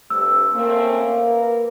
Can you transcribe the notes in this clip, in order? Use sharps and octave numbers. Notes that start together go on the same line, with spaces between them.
G2 C3 A3 E6
A3 A#3 C4 C#4
A#4 B4